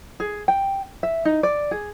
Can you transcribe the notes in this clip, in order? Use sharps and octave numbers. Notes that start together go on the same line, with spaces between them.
G#4
G5
E5
D#4
D5
G#4